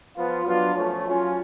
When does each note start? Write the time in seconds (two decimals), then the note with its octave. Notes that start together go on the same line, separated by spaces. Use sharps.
0.17 F3 B3 F4
0.46 F#3 B3 D4 F4
0.75 F3 A3 C#4
1.05 F#3 C#4 F4